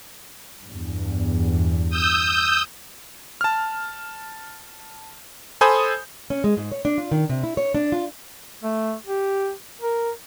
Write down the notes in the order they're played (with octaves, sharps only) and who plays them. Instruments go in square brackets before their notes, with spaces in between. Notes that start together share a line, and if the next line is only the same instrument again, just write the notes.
[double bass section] E2 G2
[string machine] D#6 E6 G6
[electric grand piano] A5 F6
A4 C5 G#5 B5 D#6 G6
[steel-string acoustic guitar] C#4
G#3
G#2
C#5
D4
F4
D#3
C3
E4
C#5
D4
F4
[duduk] A3
G4
A#4